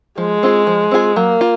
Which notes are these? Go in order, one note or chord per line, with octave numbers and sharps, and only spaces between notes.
F3 G#3
C4 F4 G#4
F3
C4 F4 G#4
F#3 A#3
F4